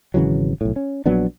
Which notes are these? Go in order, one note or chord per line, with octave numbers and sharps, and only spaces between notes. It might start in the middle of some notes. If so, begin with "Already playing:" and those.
G#1 C#3 E3 F#3
B1 A2
C#4
A#1 F#3 B3 D4